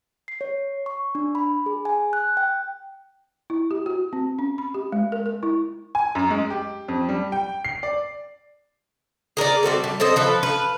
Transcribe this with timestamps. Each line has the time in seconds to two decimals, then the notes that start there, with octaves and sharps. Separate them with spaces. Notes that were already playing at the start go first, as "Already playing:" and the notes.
0.28 C7
0.41 C#5
0.86 C#6
1.15 D4
1.35 B5
1.66 G#4
1.85 G#5
2.13 F#6
2.37 G5
3.50 E4
3.71 G4
3.86 F#4
4.13 C4
4.39 C#4
4.58 B5
4.74 G4
4.92 G#3
5.12 A#4
5.26 A#4
5.43 E4
5.95 G#5
6.15 F#2
6.31 G#3
6.50 G4
6.88 F2
7.09 G3
7.32 G5
7.65 C7
7.83 D5
9.37 G#4 A#4 C#5 D5
9.63 G3 C4 F#4 A4
9.84 G3
10.00 C4 A4 C5 D#5
10.16 F3 A4 B4
10.43 B4 F5